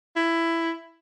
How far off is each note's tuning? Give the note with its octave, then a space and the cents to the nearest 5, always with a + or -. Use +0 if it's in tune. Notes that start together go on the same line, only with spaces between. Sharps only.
E4 +10